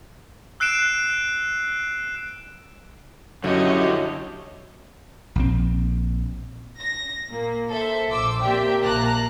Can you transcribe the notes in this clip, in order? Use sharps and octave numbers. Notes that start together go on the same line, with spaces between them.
E6 F#6 C7 D7 E7
F#2 D3 E4 F#4 G4 C#5 D#5
A#1 C4
A#6
A#2 A#3
A4 C5 E5
A#1 C5 D6 E6
A#3 C4 G4 D5 E5 G5
A#1 A#3 A5 A#5 F#6